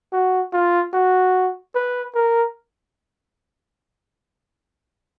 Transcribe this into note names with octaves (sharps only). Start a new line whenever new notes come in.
F#4
F4
F#4
B4
A#4